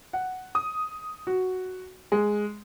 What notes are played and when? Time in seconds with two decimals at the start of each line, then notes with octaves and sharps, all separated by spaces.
0.13 F#5
0.55 D#6
1.27 F#4
2.12 G#3